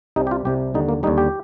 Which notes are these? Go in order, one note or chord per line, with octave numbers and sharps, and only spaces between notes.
C2 C3 G3 D#4
G4
F4
C2 C3 G3 G4
D#2 D3 G3 D#4
A#3
D#2 D3 G3 D#4
G4